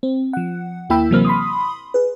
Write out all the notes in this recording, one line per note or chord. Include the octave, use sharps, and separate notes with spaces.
C4
F3 F#5
D#2 A#3 E4 G5 B5 E6
C3 E3 F#3 A#3 C4 F6
B5 C6 D#6
G#4 B4